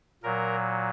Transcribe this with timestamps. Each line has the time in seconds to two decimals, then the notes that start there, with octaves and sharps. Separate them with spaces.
0.23 A#2 F#3 A#4